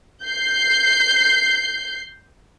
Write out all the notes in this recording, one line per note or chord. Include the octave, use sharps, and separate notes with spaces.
G6 C7